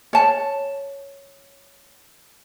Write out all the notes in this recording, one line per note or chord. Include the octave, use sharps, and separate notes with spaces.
C#5 A5